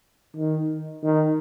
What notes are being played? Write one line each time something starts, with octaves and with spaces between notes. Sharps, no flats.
D#3
D#3